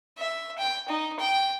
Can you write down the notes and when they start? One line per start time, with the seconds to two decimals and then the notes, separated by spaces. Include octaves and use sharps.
0.18 E5
0.58 G5
0.88 D#4
1.19 G5